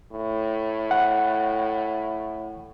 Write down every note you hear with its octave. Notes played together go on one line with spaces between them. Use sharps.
A2
F#5